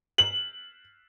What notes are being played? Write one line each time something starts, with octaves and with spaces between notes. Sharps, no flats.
F#7